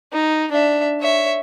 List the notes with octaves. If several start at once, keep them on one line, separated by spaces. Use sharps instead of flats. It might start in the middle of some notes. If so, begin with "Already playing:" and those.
D#4
D4 E5
C#5 E5